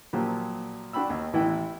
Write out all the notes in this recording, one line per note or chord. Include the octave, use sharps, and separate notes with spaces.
A#2 F3 F#3 G4
D4 F#4 G5 B5 E6
D#2
A1 E3 B3 E4 G5